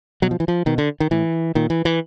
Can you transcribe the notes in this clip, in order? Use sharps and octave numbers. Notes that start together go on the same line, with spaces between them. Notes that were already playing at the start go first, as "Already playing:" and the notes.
B2 F#3
F3
E3
F3
B2 D#3
D3
D#3
A2 E3
A#2 D#3
E3
E3